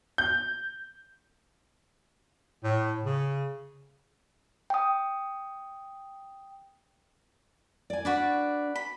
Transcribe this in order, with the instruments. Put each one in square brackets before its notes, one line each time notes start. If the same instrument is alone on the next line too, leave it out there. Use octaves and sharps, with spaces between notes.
[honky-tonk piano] G6
[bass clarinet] A2
C#3
[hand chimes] G5 D#6
[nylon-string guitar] D5 G#5
[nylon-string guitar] D4 [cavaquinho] F#4 B4 D5
[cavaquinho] B5